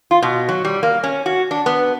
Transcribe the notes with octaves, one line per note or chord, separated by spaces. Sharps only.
F4
B2
F#3
G3
A#3
C#4
F#4
D4
B3